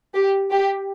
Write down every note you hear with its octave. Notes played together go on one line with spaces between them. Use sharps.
G4
G4